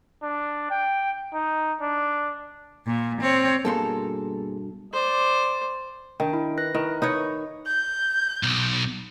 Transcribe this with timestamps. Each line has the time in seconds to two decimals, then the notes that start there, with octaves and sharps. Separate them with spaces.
0.22 D4
0.70 G5
1.34 D#4
1.81 D4
2.86 A#2
3.21 C4 C#5
3.65 G2 B2 A#3 G#4 A4 C6
4.94 C5 D5
6.20 D#3 D4 G5
6.33 E4
6.58 B4 F#6 A#6
6.75 D#3 E4
7.02 D#4 B4 C#5
7.66 G6
8.43 B1